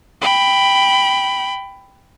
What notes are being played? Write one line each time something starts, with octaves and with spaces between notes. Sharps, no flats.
G5 B5